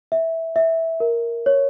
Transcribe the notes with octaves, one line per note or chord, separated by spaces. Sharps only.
E5
E5
A#4
C#5